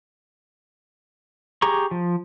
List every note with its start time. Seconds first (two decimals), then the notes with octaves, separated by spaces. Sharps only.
1.62 G4 G#4 A#5 C#6
1.91 F3